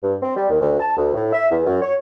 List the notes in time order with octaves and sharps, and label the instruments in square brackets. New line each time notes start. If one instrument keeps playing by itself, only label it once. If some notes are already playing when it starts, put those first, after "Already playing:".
[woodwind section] G2
C4
G3
D#2
D2
A5
D2
A2
E5
E2
F#2
C#5